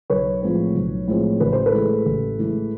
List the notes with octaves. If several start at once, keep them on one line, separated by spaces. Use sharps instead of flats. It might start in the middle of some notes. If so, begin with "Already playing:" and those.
B1 B4 C#5
A2 F3 G#3 C4
B1
A2 F3 G#3 C4
A1 B4
C5
A4 B4
A2 E3 G#3
A1
A2 E3 G#3